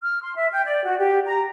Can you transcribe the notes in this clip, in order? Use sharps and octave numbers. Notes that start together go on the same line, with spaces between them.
F6
C6
E5
G5
D5
F#4
G4
A#5